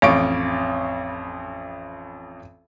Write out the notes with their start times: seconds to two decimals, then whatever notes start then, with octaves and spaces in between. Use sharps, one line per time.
0.02 A1 F2 F5 C#6 D7